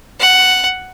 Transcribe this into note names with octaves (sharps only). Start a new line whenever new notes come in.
F#5